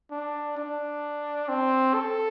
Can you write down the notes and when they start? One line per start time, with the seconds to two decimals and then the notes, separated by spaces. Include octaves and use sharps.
0.11 D4
0.57 D4
1.49 C4
1.94 A4